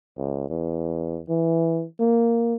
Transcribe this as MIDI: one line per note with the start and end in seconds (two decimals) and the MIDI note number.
0.18 0.48 37
0.50 1.20 40
1.29 1.84 52
2.00 2.57 58